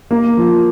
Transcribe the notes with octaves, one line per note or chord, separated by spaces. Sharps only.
A#3
F3